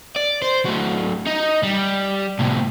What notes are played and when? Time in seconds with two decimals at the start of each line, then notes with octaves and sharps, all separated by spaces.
0.16 D5
0.42 C5
0.65 F#3 A3
1.27 D#4
1.63 G3
2.39 A2 C3